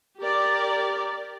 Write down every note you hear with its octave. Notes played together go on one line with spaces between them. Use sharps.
G4 A#4 D5